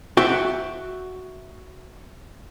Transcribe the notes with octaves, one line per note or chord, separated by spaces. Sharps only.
F#4 E5 G5